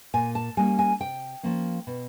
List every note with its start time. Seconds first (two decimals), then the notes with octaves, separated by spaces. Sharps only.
0.14 A#2 G#5
0.35 A5
0.57 G3 A#3 C#4 G#5
0.79 G#5
1.00 C3 G5
1.43 F3 A#3 C#4
1.87 B2